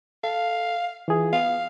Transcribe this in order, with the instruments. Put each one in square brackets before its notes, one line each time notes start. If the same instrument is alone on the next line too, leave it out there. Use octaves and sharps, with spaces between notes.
[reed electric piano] A4 [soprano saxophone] F5
[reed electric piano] E3 F4 G#4
[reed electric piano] B3 [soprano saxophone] F5